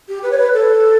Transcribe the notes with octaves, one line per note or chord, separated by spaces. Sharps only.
G4
B4
C#5
B4
A4